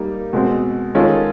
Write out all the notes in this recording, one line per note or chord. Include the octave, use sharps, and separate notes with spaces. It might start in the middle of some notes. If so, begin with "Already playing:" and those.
Already playing: G3 A#3 D#4
B2 G#3 C4
D#3 G#3 C#4 F4 A4